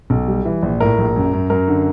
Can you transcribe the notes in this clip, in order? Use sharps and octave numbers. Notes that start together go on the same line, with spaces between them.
B1
G3
E3
A#1
A2 A#4
A#1
F#2
F#2
F#2 A#4
D3